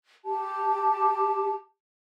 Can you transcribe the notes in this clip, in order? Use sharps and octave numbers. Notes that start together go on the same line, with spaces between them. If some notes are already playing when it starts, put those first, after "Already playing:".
G4 A5